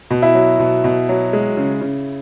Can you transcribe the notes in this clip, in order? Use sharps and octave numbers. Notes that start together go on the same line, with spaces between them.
B2
E4
F#3
B2
B2
F#3
G#3
C#3
C#3